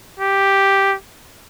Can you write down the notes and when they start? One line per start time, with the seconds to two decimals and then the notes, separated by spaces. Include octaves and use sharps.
0.20 G4